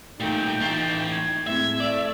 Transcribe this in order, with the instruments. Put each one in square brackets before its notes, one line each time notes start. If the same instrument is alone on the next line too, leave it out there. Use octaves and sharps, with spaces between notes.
[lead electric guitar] A#2 D#3 [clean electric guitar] A3 [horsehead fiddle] D#4 [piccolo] G5
[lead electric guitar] E3 A3 [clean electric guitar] F4
[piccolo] G#6
[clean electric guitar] A2 [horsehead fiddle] G#3 C4 [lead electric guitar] E5
[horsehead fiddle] A3 [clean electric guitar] D5 [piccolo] E6